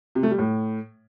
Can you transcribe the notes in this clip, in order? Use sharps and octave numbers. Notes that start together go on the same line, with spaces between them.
C3
A3
G3
A2